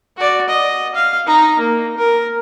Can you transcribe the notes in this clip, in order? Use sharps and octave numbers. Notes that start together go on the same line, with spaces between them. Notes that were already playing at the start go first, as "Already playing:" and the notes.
F#4 D5
D#5
F5
D#4 A#5
A#3
A#4